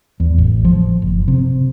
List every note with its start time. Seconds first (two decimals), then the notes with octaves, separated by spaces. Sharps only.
0.20 E2
0.38 A1
0.65 F3
1.02 F#1
1.28 C3